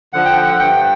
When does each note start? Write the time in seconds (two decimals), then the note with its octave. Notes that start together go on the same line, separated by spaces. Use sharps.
0.13 D3 F3 F#5
0.25 G5
0.37 F#5
0.52 F#5
0.60 G2 G5